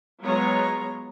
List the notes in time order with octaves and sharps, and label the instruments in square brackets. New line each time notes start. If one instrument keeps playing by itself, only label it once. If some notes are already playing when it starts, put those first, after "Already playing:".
[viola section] F#3 G#3 B3 F4 C#5 A#5